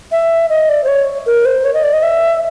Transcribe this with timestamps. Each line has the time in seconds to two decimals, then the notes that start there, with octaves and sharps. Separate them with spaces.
0.12 E5
0.50 D#5
0.69 D5
0.84 C5
0.88 C#5
1.26 A#4
1.45 C5
1.65 C#5
1.74 D#5
1.83 D5
1.93 D#5
2.03 E5